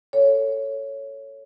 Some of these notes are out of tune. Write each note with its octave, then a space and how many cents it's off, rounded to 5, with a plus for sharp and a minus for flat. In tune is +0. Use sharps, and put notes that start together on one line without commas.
A4 +10 C#5 +0